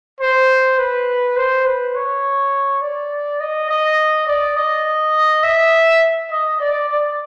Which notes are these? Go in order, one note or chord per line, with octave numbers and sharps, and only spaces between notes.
C5
B4
C5
B4
C#5
D5
D#5
D#5
D5
D#5
E5
D#5
D5
D5